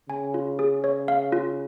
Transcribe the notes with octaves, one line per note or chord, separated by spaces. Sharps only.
C#3 G#5
F4
G#4
C#5
F5
F4